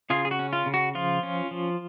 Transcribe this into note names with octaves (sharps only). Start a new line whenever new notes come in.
C#3 F4 G#4
G#4
F#4
C#4
F4
C#3
F#4
F3 F4
C#4
F3